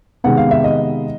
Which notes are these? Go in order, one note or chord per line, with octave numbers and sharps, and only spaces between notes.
C3 D#3 G#3 B3 F#5
F5
E5
D#5